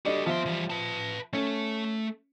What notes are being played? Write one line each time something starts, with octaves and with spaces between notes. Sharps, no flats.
G3 D4 F#4 A4 D#5
F3 B3 E5 C6
E3 G3
B4 A5
A3 C#4 A4